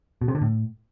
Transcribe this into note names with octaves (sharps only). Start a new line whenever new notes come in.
B2
C3
D3
A2